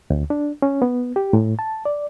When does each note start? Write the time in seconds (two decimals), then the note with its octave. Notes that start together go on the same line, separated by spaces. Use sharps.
0.10 D2
0.30 D4
0.62 C#4
0.82 B3
1.16 G4
1.33 A2
1.59 A5
1.85 D5